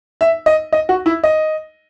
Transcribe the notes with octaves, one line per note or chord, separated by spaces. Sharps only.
E5
D#5
D#5
F#4
E4
D#5